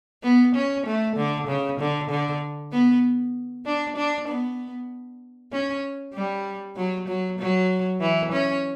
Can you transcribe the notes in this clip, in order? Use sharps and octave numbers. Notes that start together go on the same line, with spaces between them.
B3
C#4
A3
D3
C#3
D3
D3
B3
D4
D4
B3
C#4
G3
F#3
F#3
F#3
E3
C#4